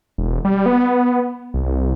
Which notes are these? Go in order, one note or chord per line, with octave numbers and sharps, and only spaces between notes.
E1
G3
B3
C2